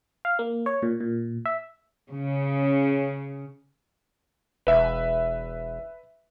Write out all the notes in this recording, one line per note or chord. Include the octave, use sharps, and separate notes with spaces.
F5
A#3
C#5
A#2
A#2
E5
C#3
E1 B4 E5